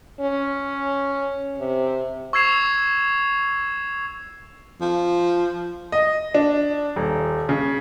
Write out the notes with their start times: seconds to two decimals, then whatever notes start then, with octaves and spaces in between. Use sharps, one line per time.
0.21 C#4
1.58 C3
2.33 C#6 E6 G#6 C7 E7 F7
4.81 F3
5.92 D#5
6.35 D4
6.96 D#1
7.49 C#3